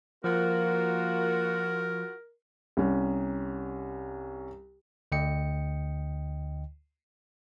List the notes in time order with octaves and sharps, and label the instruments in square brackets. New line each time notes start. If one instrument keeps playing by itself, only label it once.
[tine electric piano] F3 [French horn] A#3 [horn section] F4 F#4 [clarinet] A#4
[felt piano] C2 C#4
[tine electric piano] D2 D3 D#5 G5 C#7